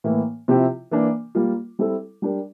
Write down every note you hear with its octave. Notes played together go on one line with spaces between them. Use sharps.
A2 E3 A#3
C3 F3 C4 E4 G4
E3 A#3 D4
G3 A#3 F4
G3 C4 E4 A4
G3 D4 G4 A#4